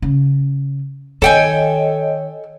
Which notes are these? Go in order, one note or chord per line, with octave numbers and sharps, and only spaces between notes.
C#3
D#3 A4 C#5 D#5 G5 G#5